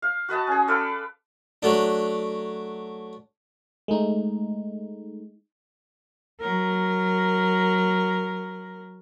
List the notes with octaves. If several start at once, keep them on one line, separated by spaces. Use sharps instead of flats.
F5
F#4 B4 D#5 A5
C#4 G#4
A4 B4 D5 F5
F#3 A3 D4
G#3 A3 D#4
F#3 A#4